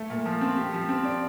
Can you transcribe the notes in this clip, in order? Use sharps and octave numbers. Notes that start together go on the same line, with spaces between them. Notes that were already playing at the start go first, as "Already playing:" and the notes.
Already playing: A3
A#2
F3
C4
G4
F3
C4
D5